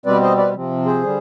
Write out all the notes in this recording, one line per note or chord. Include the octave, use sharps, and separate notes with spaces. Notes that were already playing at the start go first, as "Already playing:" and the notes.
B2 G3 C4 B4 D5
C5 D#5
B4 D5
C3 F3 C4
G#4 C5
D3 G3